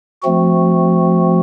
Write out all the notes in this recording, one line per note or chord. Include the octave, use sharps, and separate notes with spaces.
F3 A3 C4 F#4